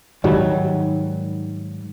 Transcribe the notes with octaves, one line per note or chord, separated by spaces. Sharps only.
G#2 D#3 F#3 G3